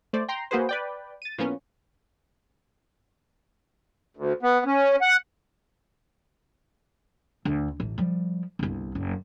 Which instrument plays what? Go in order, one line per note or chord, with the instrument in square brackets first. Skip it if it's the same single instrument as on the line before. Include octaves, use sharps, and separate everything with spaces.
[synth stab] A3 C5 D5
G5 A#5 C6
A#3 F#4 G#4 B4 C5
B4 D5 G5
A6 D#7
A2 F3 A#3 B3 C#4
[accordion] D2
B3
C#4
F#5
[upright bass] D2
A1
F3 G3
G1 C2
F#1